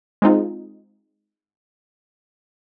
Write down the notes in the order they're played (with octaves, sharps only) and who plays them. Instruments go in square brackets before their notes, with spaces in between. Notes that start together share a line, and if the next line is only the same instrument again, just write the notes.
[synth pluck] G#3 C4 D#4 F4